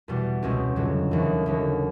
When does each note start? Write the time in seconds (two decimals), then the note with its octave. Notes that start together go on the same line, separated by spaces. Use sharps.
0.08 E2 B2 G3
0.43 C#2 B2 G#3 C4
0.76 F2 D3 F#3
1.11 D#2 C#3 E3
1.46 D#2 D3 F#3